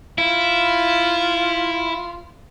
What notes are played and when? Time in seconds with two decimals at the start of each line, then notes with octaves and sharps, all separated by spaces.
0.18 E4 F4